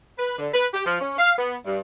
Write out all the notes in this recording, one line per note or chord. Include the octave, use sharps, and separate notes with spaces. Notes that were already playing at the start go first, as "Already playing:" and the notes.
B4
D3
B4
G4
F3
C#4
F5
B3
G2